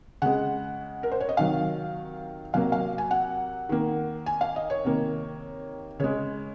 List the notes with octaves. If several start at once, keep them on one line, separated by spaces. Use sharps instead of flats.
C#3 G#3 F#5
A#4
C5
C#5
D#5
C3 D#3 F#3 F5
C3 F#3 A#3 F5
F5
G#5
F#5
D#3 A#3
G#5
F5
D#5
C#5
C3 D#3 A#3
C#3 G#3 C#5